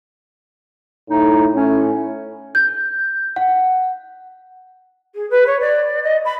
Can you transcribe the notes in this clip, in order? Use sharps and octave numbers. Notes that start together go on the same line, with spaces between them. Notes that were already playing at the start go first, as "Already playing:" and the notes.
A2 D#4
A2 C#4
G6
F#5
G#4
B4
C#5
D5
D#5
B5